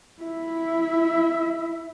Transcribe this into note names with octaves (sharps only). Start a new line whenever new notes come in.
E4 E5